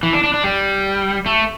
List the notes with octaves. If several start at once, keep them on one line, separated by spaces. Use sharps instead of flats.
E3
D4
D4
D4
G3
A3